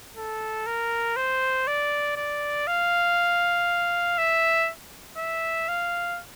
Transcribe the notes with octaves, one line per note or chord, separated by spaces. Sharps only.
A4
A#4
C5
D5
D5
F5
E5
E5
F5